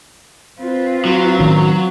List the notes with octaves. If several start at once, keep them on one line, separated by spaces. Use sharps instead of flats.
C4 F4 B4
F#3
A2 D#3 C#4